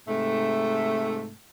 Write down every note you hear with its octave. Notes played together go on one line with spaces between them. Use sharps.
G#2 C3 A3